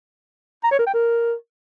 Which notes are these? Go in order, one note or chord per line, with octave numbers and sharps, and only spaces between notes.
A#5
C#5
A#4
G5
A#4